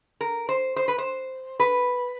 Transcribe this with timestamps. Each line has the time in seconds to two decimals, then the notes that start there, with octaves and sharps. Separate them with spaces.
0.21 A#4
0.49 C5
0.76 C5
0.88 B4
0.98 C5
1.60 B4